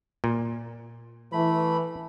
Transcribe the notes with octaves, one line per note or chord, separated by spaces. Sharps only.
A#2
E3 A3 B5